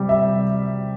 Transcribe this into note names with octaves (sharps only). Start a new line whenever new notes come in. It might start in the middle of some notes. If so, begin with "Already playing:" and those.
Already playing: C3 G3 G5
E5